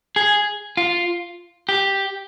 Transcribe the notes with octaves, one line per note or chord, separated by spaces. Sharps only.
G#4
F4
G4